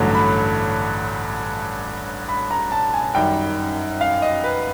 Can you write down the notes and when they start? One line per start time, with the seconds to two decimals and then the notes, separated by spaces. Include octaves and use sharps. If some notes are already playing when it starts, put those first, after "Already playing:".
Already playing: A1 G2 D3 F#3 A3
0.15 B5
2.29 B5
2.51 A#5
2.72 A5
2.94 G#5
3.14 F#2 D#3 G3 G5
4.01 F5
4.22 D#5
4.44 B4